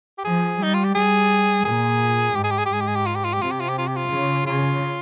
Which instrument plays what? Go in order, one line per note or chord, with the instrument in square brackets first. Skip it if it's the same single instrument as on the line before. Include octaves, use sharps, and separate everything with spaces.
[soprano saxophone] G4
[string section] F3 [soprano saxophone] G#4
[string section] G3 [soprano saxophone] D#4
[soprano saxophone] F4
G4
[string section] G3 [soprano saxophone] G#4
[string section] A#2 [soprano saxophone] G#4
[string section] G#2 [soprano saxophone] G4
[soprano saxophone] G#4
G4
G#4
G4
[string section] G#2 [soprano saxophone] G#4
[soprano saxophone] G4
G#4
G4
F4
G4
F4
G4
[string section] C3 [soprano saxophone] F4
[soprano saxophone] G4
F4
G4
F4
G4
F4
[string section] C#3
[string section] C#3 [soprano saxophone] F4